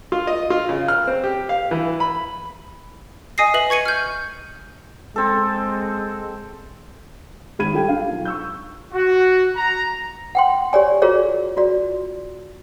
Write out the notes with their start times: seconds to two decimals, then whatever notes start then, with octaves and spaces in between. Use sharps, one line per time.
0.12 F4
0.27 D#5
0.50 F4
0.69 C#3
0.88 F6
1.07 C4
1.24 G4
1.49 F5
1.71 E3
2.00 B5
3.38 D#5 G#5 D#6 A#6 C7
3.54 B4 E5 F#7
3.70 C#6 G#6 C#7 D#7
3.86 F6 G6
5.16 G#3 C4 A4
7.59 G#1 G#3 B5 G#6 D#7
7.73 G3 F4 G4 A4 G5
7.88 D4 F4 F5
8.11 B1
8.25 C#6 E6 G6
8.93 F#4
9.56 A#5
10.35 F#5 G5 C6
10.73 G4 C#5 D5 G#5
11.02 F4 F#4 G#4 A#4 C#5 D5
11.57 F4 F#4 D5